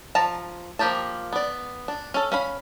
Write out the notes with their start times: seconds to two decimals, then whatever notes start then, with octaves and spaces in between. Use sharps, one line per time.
0.15 F3 A5 A#5
0.79 F3 A#3 G4 G5 A5
1.33 B3 D5
1.88 D4
2.14 C#4 A4
2.32 C#4 F5 B5